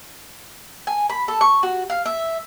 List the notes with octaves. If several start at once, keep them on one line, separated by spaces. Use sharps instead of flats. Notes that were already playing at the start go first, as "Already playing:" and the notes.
G#5
B5
A4
C#6
F#4
F5
E5